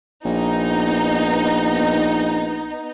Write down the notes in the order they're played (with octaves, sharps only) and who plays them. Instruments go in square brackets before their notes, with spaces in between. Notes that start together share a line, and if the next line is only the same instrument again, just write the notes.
[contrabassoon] A#1 [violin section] B3 D#4